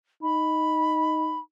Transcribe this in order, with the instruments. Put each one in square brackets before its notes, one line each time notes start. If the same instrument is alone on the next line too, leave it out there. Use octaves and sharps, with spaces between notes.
[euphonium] D#4 [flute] B5